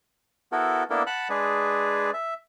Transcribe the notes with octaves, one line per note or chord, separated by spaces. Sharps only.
B3 E4 F#4 A4 A#4
A#3 B3 D4 E4 A4 A#4
F#5 A5 B5 F#6
G#3 D4 G#4 B4
E5